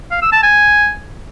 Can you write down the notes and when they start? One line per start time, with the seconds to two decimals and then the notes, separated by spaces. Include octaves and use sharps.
0.11 F5
0.22 E6
0.32 A5
0.43 G#5